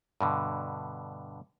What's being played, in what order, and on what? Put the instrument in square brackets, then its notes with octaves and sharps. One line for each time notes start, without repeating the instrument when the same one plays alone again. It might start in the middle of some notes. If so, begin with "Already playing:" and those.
[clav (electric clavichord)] G2 B2 D3